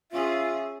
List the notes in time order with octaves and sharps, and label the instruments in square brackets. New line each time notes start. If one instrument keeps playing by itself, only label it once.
[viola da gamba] C#4 G#4 [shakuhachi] F4 [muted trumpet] E5